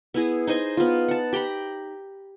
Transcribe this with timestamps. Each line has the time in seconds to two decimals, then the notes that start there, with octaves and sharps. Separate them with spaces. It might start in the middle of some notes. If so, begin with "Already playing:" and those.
0.14 B3 E4 G#4
0.47 D#4 C5 D#5 G#5
0.77 B3 F4
1.08 F#5 A5
1.33 G4 G5 A#5 B5